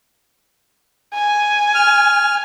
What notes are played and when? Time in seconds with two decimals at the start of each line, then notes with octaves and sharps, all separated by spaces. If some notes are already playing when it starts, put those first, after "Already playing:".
1.14 G#5
1.75 F6